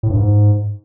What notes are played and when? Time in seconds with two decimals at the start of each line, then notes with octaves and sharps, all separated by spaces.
0.03 A2
0.10 G2
0.17 G#2